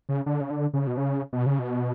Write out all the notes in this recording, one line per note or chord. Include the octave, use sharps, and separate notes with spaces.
C#3
D3
C#3
D3
C#3
B2
C#3
B2
C#3
B2